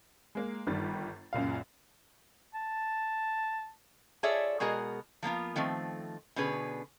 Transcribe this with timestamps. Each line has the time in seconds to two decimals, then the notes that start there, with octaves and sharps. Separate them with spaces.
0.35 G#3 A#3
0.67 G1 D#3 G3 A6
1.33 C#2 F#2 A#2 F5
2.54 A5
4.23 F4 G#4 A4 C#5 D5 E5
4.60 B2 G#3 F#4 G#4 A#4
5.23 F3 A#3 B3 F4
5.56 D#3 F3 A3 C4
6.36 B2 D3 C#4 G#4 B4